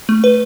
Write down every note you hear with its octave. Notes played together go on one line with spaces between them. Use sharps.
A3
B4